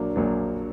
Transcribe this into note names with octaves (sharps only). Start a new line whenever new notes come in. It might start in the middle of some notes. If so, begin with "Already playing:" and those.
Already playing: A#1 A#2 F#3 A#3 D4
A#1 A#2 F#3 A#3 D4